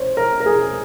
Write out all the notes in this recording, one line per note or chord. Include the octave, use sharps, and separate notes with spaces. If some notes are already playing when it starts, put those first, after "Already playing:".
Already playing: C5 C#5
A#4
A#4
G#4